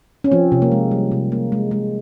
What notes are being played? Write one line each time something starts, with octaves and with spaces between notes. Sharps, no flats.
C#4
F3 C4
C3
A#3
G#3
G3
C3
A#3
G#3
G#3